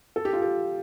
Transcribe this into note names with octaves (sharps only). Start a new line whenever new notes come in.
A4
G4
F4
G4